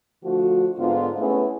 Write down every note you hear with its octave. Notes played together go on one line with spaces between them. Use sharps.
D3 F3 A3 F#4
G#2 D3 B3 F4
A3 B3 C#4 E4 G#4 B4